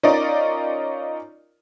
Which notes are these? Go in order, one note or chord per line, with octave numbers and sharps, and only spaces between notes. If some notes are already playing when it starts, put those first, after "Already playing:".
C#4 D#4 F4 A#4 D5 D#5